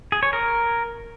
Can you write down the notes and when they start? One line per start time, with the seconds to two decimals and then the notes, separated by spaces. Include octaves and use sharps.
0.12 G#4
0.23 C#5
0.33 A#4